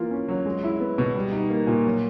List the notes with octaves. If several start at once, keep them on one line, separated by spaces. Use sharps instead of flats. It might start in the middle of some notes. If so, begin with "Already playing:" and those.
Already playing: E3 A#3 F4
C#4
F#3
G#3
E4
B3
B2
G3
D#4
A#3
A#2
F#3